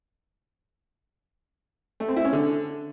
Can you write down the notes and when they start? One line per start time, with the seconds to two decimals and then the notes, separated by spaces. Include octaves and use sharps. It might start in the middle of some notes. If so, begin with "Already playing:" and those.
2.00 A3
2.08 C4
2.16 E4
2.25 C#4
2.33 D3